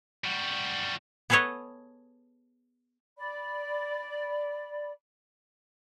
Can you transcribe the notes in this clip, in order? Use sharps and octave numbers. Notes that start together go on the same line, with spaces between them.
G3 F#4
B3 G#4 A4 B4 C#5 D#5
D5 B5